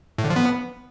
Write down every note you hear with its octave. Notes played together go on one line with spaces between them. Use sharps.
A2
D3
F3
B3